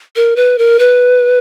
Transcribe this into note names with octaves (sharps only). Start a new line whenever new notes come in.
A#4
B4
A#4
B4